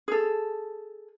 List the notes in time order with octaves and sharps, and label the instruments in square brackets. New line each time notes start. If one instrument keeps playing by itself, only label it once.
[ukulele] G#4 A4